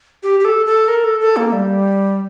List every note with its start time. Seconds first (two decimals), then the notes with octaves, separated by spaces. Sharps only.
0.23 G4
0.40 G4
0.45 A4
0.66 A4
0.88 A#4
1.04 A4
1.20 A4
1.37 A#3
1.52 G3